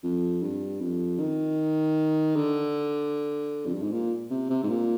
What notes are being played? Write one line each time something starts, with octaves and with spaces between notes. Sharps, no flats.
F2
G2
F2
D#3
D3
F2
G2
G#2
A#2
C3
C3
G#2
A#2